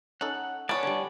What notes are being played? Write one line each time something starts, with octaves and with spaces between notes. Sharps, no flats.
C#4 D#4 A4 F#5
B3 C#5 D5 G#5 A5
D3 G3